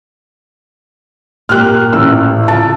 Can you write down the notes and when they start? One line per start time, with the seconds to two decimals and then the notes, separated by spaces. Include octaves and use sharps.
1.49 A#2 G4 F6 F#6
1.92 A1 E6 F6
2.48 C#3 F4 A5